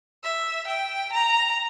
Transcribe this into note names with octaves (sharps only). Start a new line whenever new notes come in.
E5
G5
A#5